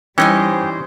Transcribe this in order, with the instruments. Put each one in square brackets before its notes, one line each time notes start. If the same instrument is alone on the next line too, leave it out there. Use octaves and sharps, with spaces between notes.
[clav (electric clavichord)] E3 C#4 D#4 [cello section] G3 C5 [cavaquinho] G4 D#5 G#5